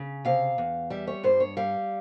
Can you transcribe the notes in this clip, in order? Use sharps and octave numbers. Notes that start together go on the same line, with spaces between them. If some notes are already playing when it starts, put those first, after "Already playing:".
Already playing: C#3
C3 F5
E2
G3 E5
C#5
G2 C5
C#5
G3 F5